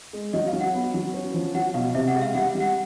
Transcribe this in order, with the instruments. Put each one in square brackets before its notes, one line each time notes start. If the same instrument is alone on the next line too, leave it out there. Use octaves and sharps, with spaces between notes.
[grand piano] G#3
[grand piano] F#3 [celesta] D#5
[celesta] F5
[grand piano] F#3
[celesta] F#5
[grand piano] B3
F#3
C#4
F3
[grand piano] F#3 [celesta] F#5
[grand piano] B2 [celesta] F5
[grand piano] C3 [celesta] E5
[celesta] F#5
[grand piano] G#3 [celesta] E5
[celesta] F5
[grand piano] G3 [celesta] F#5
[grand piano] G3
[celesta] F#5